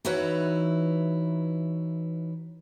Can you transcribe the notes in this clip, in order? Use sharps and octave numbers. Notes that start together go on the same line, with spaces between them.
E3 D#4 E4 F#4 B4 C#5